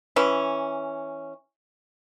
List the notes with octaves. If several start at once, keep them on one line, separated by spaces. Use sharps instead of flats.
E3 C#4